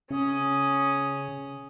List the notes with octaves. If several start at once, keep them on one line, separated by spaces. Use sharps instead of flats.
C#3 C#4 D#6